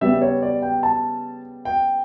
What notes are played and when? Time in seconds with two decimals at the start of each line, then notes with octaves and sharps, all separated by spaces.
0.01 C#3 G3 B3 E5
0.22 C#5
0.43 D5
0.62 G5
0.83 A5
1.65 G5